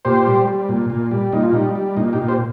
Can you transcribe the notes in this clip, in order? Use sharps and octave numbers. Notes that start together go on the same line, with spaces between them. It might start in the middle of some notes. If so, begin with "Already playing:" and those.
A#2 G4 C5
G3
G3
A#2
A#2
G3
A#2 D#4
F4
G3 D#4
G3
A#2 D#4
D#4 G4
A#2
G4 C5